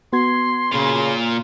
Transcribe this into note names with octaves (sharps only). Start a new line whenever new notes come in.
B3 F#4 C6 G#6
A#2 C#3 F4